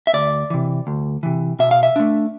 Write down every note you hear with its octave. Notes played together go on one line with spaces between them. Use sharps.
E5
D2 D5
C3 E3
D2
C3 E3
B2 E5
F5
E5
A3 D4